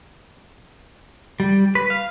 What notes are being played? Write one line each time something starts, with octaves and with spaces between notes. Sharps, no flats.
G3
B4
F5